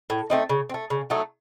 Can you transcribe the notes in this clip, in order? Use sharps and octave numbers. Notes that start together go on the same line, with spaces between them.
A2
A3 C4 D#4
C#3
C4
A3
C#3
F#3 A3 D#4